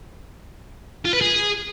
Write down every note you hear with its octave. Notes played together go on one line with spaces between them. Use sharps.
F4
B4
G#4